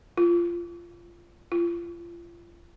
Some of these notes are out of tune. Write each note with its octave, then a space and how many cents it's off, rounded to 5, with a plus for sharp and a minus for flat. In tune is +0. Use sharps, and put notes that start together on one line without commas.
F4 -20
F4 -35